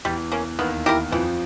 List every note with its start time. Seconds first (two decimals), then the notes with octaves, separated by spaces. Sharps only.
0.05 E2 E3 G3
0.32 A#3 C#4
0.59 D#2 D#3 B3
0.86 E4 G4 A#4
1.11 F2 E3 F3